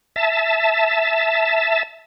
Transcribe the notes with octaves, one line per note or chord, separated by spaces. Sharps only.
E5 A5